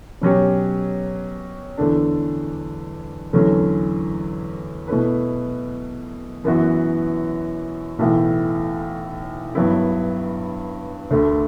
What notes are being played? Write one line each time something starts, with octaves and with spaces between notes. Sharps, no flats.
B2 F#3 C#4 G4 C#5
E2 D3 A3 D4
E2 D3 F#3 A3 C#4
B2 A3 E4 B4
F#2 E3 B3 F#4
B1 A2 E3 A3
G2 F#3 B3 E4
D2 D3 A3